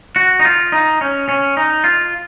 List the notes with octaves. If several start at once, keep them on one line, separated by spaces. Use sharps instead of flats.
F#4
D#4
F4
D#4
C#4
C#4
D#4
F4